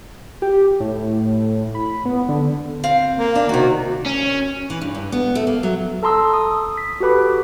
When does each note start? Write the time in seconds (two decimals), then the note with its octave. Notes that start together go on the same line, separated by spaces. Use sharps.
0.42 G4
0.80 A2
1.75 B5
2.05 B3
2.29 D3
2.84 C4 F5
3.17 A#3
3.35 D4
3.49 C3 D#3 F#4
4.06 C#4
4.70 E3
4.82 G2
4.95 G2
5.12 B3
5.35 A3
5.47 A#3
5.63 F#3
6.03 A4 A5 A#5 C6 D#6 E6
6.33 D#6
6.77 B6
7.00 F#4 G4 A4 B4 B5 D6